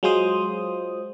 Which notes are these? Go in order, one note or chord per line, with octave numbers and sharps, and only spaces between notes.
F#3 G#3 F4 C5 D#6